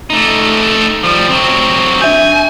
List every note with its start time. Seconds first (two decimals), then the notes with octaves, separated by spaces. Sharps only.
0.10 A3 D#4
1.03 F3 G3
1.29 F#3 C4
2.02 D4 E5 G#5 G6